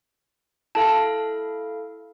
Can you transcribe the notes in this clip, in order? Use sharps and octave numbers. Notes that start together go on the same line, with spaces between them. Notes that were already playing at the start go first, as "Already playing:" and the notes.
E4 A4 F5 A5